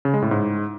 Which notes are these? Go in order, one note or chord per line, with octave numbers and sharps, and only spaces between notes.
C#3
G#3
A2
G#2